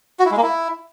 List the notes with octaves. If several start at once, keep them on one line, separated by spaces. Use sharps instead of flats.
F#4
E4
G#3
A#3
E4